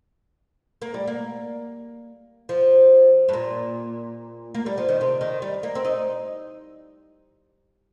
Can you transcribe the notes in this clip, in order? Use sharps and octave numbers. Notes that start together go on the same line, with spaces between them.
A#3
G3
A#3
F3
G2
A#2
A#3
G3
F3
D#3
C3
D#3
G3
A#3
C4
D#4